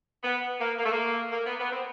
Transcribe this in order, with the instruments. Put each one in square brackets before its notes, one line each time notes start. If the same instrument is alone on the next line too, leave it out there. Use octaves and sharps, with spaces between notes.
[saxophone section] B3
A#3
A#3
A3
A#3
A#3
B3
B3
C4